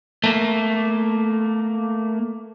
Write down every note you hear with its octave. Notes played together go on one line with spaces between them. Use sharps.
A3 A#3